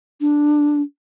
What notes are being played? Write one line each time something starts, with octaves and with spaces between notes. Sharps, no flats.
D4